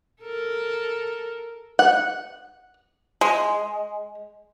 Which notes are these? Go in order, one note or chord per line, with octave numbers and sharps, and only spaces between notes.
A4 A#4
F#5
G#3